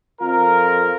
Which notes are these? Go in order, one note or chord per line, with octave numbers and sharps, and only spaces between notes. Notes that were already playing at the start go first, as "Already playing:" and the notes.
F2 F4 A#4